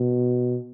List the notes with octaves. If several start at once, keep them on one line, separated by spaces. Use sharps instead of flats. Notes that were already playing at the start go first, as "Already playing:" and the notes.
Already playing: B2